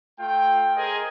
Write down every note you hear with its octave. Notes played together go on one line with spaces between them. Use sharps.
A3 F4 G5
G#4 A#4 C5 D#5 G#5